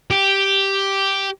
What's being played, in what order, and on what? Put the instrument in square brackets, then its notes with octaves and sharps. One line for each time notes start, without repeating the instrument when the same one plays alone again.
[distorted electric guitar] G4